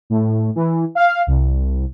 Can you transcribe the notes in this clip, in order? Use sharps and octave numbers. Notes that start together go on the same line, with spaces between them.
A2
E3
F5
C2